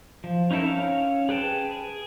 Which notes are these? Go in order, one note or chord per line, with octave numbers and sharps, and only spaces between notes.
F3
C#4 D#4 E4 A4 A#4
C#4 C#5 F5
G#4 B4 G5 A5
G#4